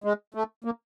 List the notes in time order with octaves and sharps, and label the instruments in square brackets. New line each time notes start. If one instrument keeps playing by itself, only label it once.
[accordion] G#3
A3
A#3